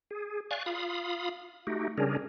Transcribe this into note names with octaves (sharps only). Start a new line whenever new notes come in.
G#4
D5 F5 G#5 C#6 F#6
F4 F5 B5 D#6
A3 D#4 F#4 G4
C#3 G3 C#4 D4 G#4 A#4